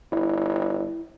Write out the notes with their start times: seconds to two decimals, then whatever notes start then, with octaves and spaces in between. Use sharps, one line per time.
0.12 G1 E4